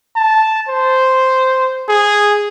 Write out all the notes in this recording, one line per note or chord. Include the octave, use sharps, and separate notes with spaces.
A5
C5
G#4